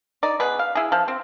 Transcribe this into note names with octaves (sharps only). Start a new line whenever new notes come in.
D#4 D5
B2 G#4 B4
F5
E4 G#4
F3
C4